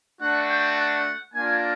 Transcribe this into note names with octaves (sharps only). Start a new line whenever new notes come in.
A3 D4 F#4 F#5
G5
F#5
A#3 D4 F4 G#5